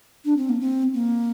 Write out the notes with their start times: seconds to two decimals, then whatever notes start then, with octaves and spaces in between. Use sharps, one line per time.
0.24 D4
0.36 C4
0.49 A#3
0.60 C4
0.93 A#3